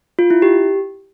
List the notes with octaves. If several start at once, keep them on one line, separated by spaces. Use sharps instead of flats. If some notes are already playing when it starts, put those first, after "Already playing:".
F4
E4
G4